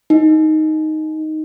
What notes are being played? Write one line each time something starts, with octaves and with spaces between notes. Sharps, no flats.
D#4